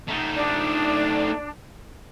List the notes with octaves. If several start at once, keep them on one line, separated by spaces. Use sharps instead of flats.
A3 D#4
D4